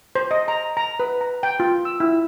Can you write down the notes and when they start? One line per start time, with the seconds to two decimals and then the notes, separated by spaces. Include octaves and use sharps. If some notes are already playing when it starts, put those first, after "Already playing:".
0.15 C5
0.31 D#5
0.48 A#5
0.77 A#5
1.00 B4
1.21 A#5
1.43 G5
1.60 F4
1.85 E6
2.00 E4